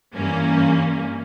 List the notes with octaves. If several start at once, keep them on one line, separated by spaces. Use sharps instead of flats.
G2 E3 A#3 C#4